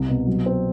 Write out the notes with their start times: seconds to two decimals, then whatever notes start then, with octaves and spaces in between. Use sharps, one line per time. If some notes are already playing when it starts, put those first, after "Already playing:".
Already playing: C2
0.09 B2
0.27 F#3
0.46 C4